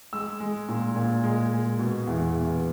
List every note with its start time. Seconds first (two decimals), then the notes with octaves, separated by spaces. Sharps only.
0.13 G#3 E6
0.40 G#3
0.69 A#2
0.96 A#2
1.24 G#3
1.52 G#3
1.79 B2
2.07 E2
2.35 E2